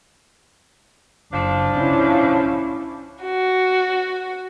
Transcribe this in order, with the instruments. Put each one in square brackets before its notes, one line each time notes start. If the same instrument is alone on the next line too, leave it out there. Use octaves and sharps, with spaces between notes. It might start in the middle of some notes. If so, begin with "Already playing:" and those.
[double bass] F#1 [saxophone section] F3 D4
[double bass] C#4 E4
[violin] F#4